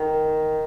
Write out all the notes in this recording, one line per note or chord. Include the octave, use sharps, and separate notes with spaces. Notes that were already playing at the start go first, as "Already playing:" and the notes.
Already playing: D#3